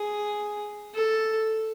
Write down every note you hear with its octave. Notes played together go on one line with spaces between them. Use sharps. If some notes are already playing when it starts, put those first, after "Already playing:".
Already playing: G#4
A4